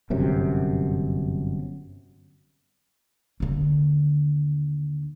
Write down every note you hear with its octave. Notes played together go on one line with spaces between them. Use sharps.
G1 F#2 C3
D#2 D3